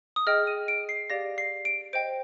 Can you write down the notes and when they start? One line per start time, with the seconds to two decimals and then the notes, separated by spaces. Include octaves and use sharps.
0.16 D#6
0.27 G#4 D#5 G5 F6
0.47 D#7
0.68 D7
0.89 C7
1.10 G4 D5 F5 A#6
1.38 C7
1.65 D7
1.93 C5 D#5 G5 D7